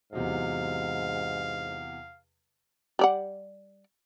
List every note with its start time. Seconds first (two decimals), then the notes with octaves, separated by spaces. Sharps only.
0.13 E2 G#2 C3 F#3 F5
2.99 G3 D5 F#5